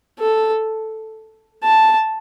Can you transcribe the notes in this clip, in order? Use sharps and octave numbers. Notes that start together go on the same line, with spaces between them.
A4
A5